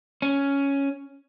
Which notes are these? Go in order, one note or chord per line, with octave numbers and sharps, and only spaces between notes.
C#4